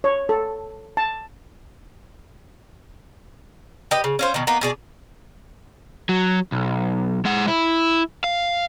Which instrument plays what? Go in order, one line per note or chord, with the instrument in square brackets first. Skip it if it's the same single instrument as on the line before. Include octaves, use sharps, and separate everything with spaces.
[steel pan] C#5
A4
A5
[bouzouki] G4 B4 D#5
C#3
C#4 F4 C5
B2 D#3
A#3 B3 D#4
B2 G#4 D5
[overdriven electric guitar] F#3
B1
G#3 F#5
E4
F5